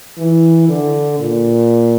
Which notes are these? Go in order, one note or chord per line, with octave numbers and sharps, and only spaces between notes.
E3
D3
A#2